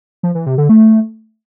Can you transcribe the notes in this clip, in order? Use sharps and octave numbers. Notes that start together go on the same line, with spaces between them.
F3
E3
C3
D3
A3